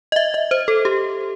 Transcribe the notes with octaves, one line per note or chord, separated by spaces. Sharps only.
D#5
E5
D#5
C5
A4
G4